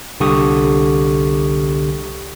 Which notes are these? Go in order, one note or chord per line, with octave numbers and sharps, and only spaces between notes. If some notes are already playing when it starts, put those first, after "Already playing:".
C2 D3 G4 C#6 D#6